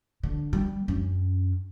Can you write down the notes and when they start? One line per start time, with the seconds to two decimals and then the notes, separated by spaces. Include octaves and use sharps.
0.23 D3
0.53 G3
0.88 F#2 C#4